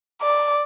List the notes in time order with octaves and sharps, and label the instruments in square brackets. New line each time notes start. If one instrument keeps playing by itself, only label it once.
[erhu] D5